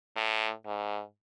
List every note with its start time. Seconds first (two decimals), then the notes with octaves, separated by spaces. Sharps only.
0.16 A2
0.66 G#2